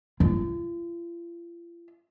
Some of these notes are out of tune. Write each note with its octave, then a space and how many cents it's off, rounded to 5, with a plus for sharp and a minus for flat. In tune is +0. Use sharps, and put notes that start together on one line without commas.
F4 -40